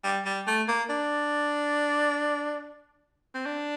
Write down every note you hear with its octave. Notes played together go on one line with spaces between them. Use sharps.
G3
G3
A3
A#3
D4
C4
D4